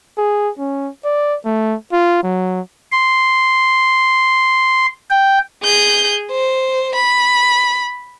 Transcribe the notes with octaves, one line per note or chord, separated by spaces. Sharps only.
G#4
C#4
D5
A3
F4
F#3
C6
G5
G#4 G6
C5
B5